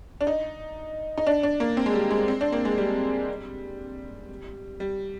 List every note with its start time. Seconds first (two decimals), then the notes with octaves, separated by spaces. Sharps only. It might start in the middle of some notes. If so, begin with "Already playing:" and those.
0.21 D4
0.27 D#4
1.18 D#4
1.27 D4
1.43 D4
1.60 A#3
1.77 C4
1.86 G#3
1.94 G3
2.11 G#3
2.28 C4
2.41 D4
2.52 A#3
2.65 G#3
2.78 G3
4.80 G3